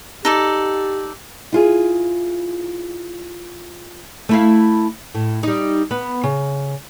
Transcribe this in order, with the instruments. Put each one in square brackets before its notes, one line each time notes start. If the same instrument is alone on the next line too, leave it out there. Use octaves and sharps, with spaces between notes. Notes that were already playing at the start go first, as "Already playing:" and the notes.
[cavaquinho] D#4 A4 D5 [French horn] G4
[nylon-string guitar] E4 F4 G#4
[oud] A3 E4 F5
A2
G3 D#4
B3
C#3